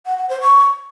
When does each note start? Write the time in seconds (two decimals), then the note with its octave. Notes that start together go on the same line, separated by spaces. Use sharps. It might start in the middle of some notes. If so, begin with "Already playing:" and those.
0.06 F#5
0.18 F#5
0.29 C5
0.41 C#6